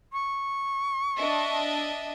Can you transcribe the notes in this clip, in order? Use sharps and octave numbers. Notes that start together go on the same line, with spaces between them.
C#6
D4 D#5 E5